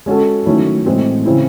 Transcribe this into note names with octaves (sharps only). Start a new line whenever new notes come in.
G#3 C#4 F#4 A4
D#3 F#3 A3 C#4 E4
A2 E3 G#3 C4
C#3 E3 C4 E4